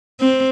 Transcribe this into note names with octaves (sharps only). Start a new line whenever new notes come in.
C4